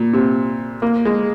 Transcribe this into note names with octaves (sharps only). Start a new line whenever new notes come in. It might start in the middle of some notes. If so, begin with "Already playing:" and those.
Already playing: A#2
C3
A#3
G#3